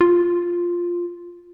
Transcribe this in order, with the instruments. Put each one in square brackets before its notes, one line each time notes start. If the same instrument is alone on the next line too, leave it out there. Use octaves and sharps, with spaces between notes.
[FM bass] F4